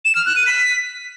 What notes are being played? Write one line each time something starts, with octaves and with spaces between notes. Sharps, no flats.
E7
F6
F#6
D#7
B6